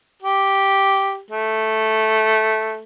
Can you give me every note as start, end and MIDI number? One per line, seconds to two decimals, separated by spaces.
0.22 1.19 67
1.31 2.84 57